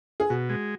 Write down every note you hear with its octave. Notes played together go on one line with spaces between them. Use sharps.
G#4
B2 F#4
G#3